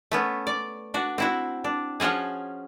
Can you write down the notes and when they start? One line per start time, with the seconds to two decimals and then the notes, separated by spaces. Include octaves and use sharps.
0.12 A3 B3 C#4
0.47 D5
0.94 D4 F#4
1.18 C4 E4 F#4
1.64 D4
2.00 F3 C#4 F4 F#4 G#4